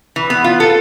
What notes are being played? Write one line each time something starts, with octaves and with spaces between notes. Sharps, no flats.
E3
B3
F4
A4